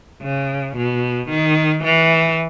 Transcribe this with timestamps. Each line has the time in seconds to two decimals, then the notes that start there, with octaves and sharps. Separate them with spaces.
0.23 C#3
0.77 B2
1.30 D#3
1.84 E3